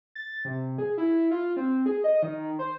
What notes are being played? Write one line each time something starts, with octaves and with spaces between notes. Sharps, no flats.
A6
C3
G#4
E4
F4
C4
G#4
D#5
D#3
C5